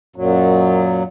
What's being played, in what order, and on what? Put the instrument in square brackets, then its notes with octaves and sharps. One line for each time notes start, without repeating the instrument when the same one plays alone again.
[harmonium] F#2 A#2 F#3